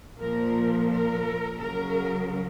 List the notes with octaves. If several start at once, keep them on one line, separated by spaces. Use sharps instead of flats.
A#2 F3 A#4
A#4
C#3 F#3 A#4